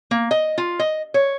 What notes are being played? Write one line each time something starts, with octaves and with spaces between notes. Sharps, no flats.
A#3
D#5
F4
D#5
C#5